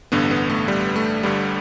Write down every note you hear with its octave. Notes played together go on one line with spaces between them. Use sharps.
A1 G2 D3 B3
B3
A3
G3
A3
G1 G2 D3 G3